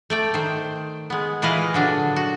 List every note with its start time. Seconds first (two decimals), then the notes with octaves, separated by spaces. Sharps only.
0.10 A3 D5 G5
0.34 D#3 C5
1.10 G#3 B3
1.42 A#2 E3 G#4 B4 D#5 F5
1.74 D3 F#3 D4
2.16 F#4